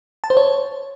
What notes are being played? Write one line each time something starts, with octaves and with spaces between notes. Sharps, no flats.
A5
C5
C#5